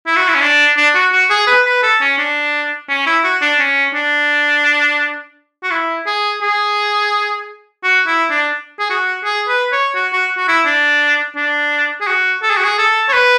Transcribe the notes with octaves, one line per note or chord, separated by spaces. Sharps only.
E4
F#4
E4
C#4
D4
D4
F#4
F#4
G#4
B4
B4
A4
C#4
D4
C#4
E4
F#4
D4
C#4
D4
F#4
E4
G#4
G#4
F#4
E4
D4
G#4
F#4
G#4
B4
C#5
F#4
F#4
F#4
E4
D4
D4
G#4
F#4
A4
G#4
F#4
G#4
A4
C#5
B4